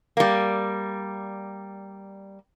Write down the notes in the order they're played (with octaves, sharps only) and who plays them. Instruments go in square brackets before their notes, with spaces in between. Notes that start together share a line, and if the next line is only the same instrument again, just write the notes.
[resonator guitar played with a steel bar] G3 A#3